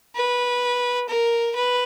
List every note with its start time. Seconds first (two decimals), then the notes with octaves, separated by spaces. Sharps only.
0.15 B4
1.09 A#4
1.55 B4